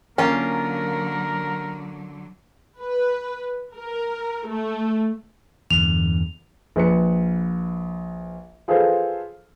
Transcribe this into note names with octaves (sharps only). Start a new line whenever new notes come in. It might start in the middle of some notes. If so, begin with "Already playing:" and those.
D3 F#3 A#3 C#4 F4 A#4 G#5
B4
A#4
A3
E2 G2 D3 F7
A#1 B4 C#7
F4 G#4 A4 B4 C5 F5